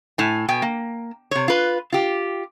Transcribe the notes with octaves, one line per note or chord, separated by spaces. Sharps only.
A2 G#5
B2 G5 G#5
A#3
C3 C#5
F4 B4
F4 G4